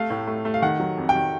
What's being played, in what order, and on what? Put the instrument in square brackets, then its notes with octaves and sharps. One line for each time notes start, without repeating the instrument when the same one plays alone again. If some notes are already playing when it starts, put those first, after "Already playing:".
Already playing: [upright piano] A3 F5
A2
A3
A3
F5
D#3 F#5
F#3
F2
G5
D#3